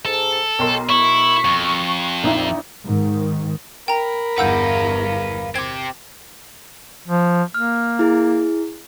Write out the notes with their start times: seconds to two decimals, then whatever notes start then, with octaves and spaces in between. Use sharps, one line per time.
0.05 G#2 A4
0.59 B1 D#4 A#4 C#5 G5 C6
0.89 E4 C#6
1.45 F2
2.23 A#1 D#4 E4
2.86 G#2 D#3
3.88 A#4 G5 A#5 B5
4.38 G1 E2 B4 F5 F#5 E6 G6
5.56 C4 G4 G#6
7.08 F3
7.54 A#3 F6
7.99 E4 G#4